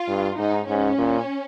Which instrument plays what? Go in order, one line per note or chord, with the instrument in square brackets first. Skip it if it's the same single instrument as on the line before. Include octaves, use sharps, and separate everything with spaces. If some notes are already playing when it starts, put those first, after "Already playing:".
Already playing: [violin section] F4
[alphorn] G2
[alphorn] G#2 [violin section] D#4
[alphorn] G#2 [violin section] C#4
[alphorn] A#2